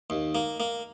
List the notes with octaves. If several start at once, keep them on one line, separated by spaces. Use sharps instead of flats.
D#2
A#3
A#3